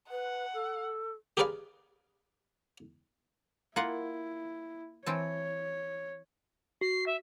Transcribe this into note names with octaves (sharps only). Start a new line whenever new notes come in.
B4 F#5
A4
G4 G#4 A#4 B4 D5 F5
A#3 E4 F4 F#5
E3 C4 C#5 A5
F#4 C7
E5